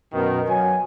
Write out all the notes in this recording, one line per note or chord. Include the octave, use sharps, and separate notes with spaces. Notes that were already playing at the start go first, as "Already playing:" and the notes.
F#2 B2 D#3
F#3 G#5